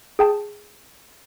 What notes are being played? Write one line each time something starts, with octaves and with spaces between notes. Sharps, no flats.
G#4 G5 A5